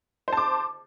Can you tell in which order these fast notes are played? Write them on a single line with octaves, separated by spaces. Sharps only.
C5 A5 D6